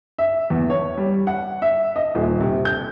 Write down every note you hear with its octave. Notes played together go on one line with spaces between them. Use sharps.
E5
E2
C#5
G3
F#5
E5
D#5
D#1
C3
G6